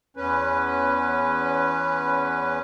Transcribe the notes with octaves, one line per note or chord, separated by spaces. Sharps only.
E2 C#4 B4